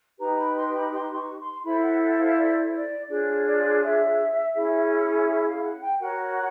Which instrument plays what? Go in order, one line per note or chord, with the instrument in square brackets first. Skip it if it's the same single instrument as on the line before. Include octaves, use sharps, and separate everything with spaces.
[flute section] D#4 G4 B4 A#5
B5
C6
B5
C6
C6
C#6
C6
E4 A4 C5 B5
F#5
F#5
F5
D5
D5
D4 F4 G#4 C#5 D5
D5
E5
C#4 E4 G#4
E5
F5
F#5
G5
F#4 A#4 C#5 F#5